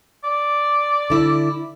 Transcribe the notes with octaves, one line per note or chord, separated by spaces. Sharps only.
D5
D3 E4